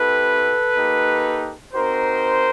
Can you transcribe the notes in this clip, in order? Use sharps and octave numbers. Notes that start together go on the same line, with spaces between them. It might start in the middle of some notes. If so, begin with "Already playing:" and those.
Already playing: C4 E4 G4 A4 B4
A#3 D#4 G4
C4 D#4 F#4 A#4 C5